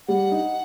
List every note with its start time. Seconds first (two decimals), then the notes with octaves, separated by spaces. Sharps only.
0.08 G3 F#5
0.32 D#4